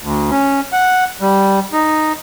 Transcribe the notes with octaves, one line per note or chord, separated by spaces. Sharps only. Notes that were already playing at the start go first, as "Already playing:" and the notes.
D2
C#4
F#5
G3
D#4